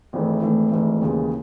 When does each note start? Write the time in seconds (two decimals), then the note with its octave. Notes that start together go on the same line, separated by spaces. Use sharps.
0.13 G#1 G#2 E3 A3
0.42 G#1 G#2 E3 A3
0.72 G#1 G#2 E3 A3
1.01 D#2 C#3 E3 G#3